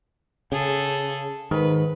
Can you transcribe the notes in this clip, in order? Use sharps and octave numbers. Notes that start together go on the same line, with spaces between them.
C#3 G#4 A4
G#2 D#3 B4